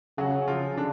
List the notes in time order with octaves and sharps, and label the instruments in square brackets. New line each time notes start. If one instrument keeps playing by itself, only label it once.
[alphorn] C#3 [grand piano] F#3 F#4
[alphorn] C#3 [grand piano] F3 F4
[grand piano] D3 D4